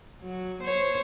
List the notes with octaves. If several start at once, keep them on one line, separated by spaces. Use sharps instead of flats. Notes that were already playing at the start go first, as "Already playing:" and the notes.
F#3
C5 C#5